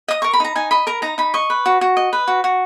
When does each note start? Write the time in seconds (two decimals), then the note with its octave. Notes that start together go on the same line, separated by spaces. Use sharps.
0.08 D#5 D#6
0.22 A#4 C#6
0.33 B5
0.40 D#4 A#5
0.56 D#4 G#5
0.71 D#5 B5
0.87 A#4 A#5
1.02 D#4 A#5
1.18 D#4 B5
1.34 D#5 C#6
1.50 B4
1.66 F#4
1.81 F#4
1.97 D#5
2.13 B4
2.28 F#4
2.44 F#4